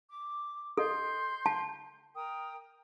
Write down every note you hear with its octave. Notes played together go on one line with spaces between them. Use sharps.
D6
A4 D#5 C6 G6
A5
A#4 G5 D#6